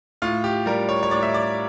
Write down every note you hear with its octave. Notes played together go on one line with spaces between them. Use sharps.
A2 F4
G4
G3 A#4
C#5
C#5
A2 D5
E5
D5